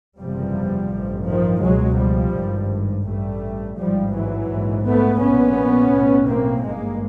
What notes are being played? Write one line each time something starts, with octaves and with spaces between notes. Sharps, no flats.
F#1 E2 C3 F3 G3
A1 G2
D#3 F3
C#2 B2 F#3 G#3
F3 G3
G#1 G2
A1 G2 G3 A3
A1 G#2 F3 G3
E3 F#3
A#1 G#2
A3 B3
A#1 A#2 B3 C#4
B1 A2
A#3 C4
G#1 G2 G#3 A#3